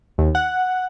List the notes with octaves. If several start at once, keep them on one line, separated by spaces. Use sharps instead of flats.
D#2
F#5